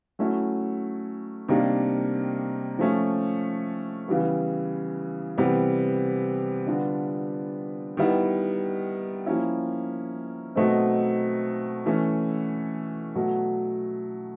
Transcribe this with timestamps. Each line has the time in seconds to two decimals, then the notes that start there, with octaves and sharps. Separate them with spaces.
0.19 F#3 A3 C#4 E4
1.48 C3 D#3 G3 A#3 D4
2.79 F3 A3 C#4
4.08 C#3 E3 G3 B3
5.38 C3 E3 G3 B3
6.66 D3 G3 B3 D4 F4
7.97 D#3 G3 B3 E4
9.26 F3 A#3 C#4 E4
10.56 B2 F#3 A3 C4 D#4
11.86 E3 A3 C#4
13.15 B2 F#3 A3